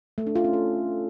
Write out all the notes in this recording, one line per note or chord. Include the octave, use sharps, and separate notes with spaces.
A3
D4
F4
C#4
A4